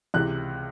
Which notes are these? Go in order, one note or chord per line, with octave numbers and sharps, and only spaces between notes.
C#2 C3 E3 F#6